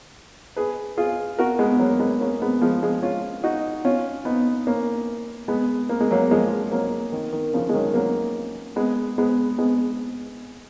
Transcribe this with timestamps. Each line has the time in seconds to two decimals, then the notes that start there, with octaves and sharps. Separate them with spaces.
0.56 G#4 B4
0.97 F4 G#4
1.39 F#4 A#4
1.59 G#3 B3
1.79 F#3 A#3
2.00 G#3 B3
2.20 A#3 C#4
2.42 G#3 B3
2.61 F3 G#3
2.82 F3 G#3
3.02 C#4 F4
3.44 D#4 F#4
3.85 C#4 F4
4.25 B3 D#4
4.67 A#3 C#4
5.48 G#3 B3
5.89 A#3
6.00 G#3
6.11 F#3 A#3
6.30 F3 G#3
6.72 F#3 A#3
7.12 D#3
7.33 D#3
7.53 C#3 F3
7.69 G#3
7.74 D#3 F#3
7.94 F#3 A#3
8.76 G#3 B3
9.18 G#3 B3
9.58 G#3 B3